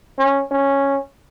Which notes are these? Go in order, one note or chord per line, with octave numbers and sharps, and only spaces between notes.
C#4
C#4